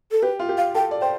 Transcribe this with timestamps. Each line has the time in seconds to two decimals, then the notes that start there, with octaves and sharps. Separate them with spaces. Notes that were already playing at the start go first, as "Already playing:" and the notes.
0.11 A4
0.22 G4 B4
0.39 F4
0.49 G4
0.57 F5
0.75 A4 G5
0.91 D5
1.01 C5 G5